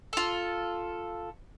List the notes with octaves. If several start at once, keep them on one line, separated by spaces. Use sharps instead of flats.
F4 A4